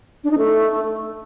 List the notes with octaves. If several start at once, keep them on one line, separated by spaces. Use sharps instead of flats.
D4
D#4
A3